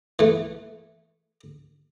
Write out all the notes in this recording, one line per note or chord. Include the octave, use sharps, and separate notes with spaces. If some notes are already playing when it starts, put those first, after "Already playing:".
E3 A3